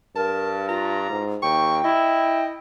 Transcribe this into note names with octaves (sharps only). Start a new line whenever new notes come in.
G2 A#4 A5
F4 A#5
G#2
D#2 G5 C#6
E4 D#5